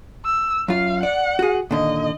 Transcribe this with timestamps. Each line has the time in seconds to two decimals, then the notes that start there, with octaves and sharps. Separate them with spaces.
0.25 E6
0.68 F#2 F4 F5
1.03 D5 F#5
1.39 F#4 G#4
1.71 A#2 D3 D#3 D#5